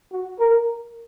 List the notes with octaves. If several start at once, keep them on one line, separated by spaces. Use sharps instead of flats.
F#4
A#4